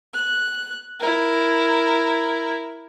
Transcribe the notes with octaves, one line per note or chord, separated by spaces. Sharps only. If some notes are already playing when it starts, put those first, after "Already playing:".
F#6
E4 A#4